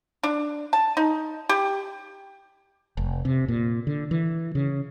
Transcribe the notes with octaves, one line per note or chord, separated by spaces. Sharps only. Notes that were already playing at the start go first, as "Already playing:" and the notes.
D4
A5
D#4
G4
F1
C3
A#2
D3
E3
C#3